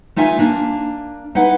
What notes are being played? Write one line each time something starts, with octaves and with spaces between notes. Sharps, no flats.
A3 D#4 F4 E5 G#5
A#3 D4
D#4 E4 B4 F#5